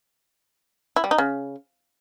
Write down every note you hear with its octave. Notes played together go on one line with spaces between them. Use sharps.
E4
G3
D#4
C#3